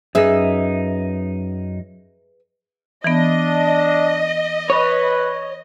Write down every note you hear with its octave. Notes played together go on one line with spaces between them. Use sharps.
F#2 D#4 G#4 B4 E5
E3 B3 D4 D#5
B4 C#5